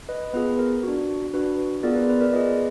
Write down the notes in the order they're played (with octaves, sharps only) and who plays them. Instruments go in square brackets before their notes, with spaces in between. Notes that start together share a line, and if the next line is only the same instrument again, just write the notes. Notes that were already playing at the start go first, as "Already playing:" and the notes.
[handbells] B4 D#5
B3 F4 G#4 B4
A#4
D4 F#4
D4 F#4 B4
B3 F4 G#4 A#4 D5
B4
B4
A#4 D5
B3 F4 G#4 B4 D#5